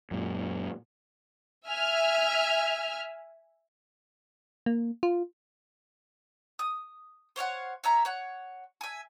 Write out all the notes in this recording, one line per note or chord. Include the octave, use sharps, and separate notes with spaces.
F#2 A#2
E5 G#5 F6
A#3
F4
D#6
C5 C#5 F5 F#5
C#5 E5 A#5
C#5 F#5
E5 G#5